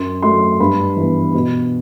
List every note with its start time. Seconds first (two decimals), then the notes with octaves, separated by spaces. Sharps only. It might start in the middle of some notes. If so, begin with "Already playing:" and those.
Already playing: F#2 C6
0.22 F#3 A3 C6
0.60 G2 B5
0.96 E3 B3
1.34 B2